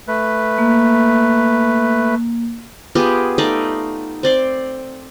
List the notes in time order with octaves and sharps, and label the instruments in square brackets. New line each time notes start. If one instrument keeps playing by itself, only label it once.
[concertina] A3 B4
[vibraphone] A#3
[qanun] B3 F4 G4 G#4
A3 D#4 D5 F5
C4 D5 C6